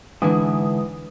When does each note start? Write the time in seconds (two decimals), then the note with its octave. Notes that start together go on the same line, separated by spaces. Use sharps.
0.22 G#2 D3 E3 E4 D#6